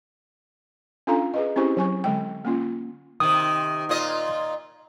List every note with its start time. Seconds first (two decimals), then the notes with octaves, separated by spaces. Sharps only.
1.07 C#4 D4 F4 A4 F5 A#5
1.34 G#4 B4 D#5
1.56 C4 C#4 E4 G4 C5 C#6
1.77 F#3 G#5 C#6
2.04 D3 G#3 G5
2.45 A#3 C#4 F4
3.20 C3 D#3 D#6
3.89 A#2 F4 D#5